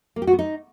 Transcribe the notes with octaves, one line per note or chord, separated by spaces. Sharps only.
A#3
G4
F#4
B3
D#4